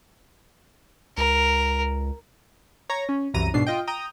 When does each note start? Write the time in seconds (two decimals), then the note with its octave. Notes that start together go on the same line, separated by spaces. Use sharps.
1.17 C#2 A#4
2.90 C#5 A#5
3.09 C#4
3.34 C2 F#2 E3 A#5 D#7
3.54 G#2 B2 D4 C7
3.67 F4 D#5 G5
3.87 G5 A#5 D#6